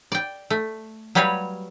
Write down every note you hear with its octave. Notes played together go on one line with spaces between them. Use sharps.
D5 G5
A3
F#3 G3 B4 C#5 F5